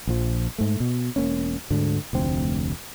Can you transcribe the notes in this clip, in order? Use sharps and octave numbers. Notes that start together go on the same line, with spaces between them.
A#1 F3
G#2 A3
B2
E1 A#3 C#4
D2 G#2 D3
F1 D2 C4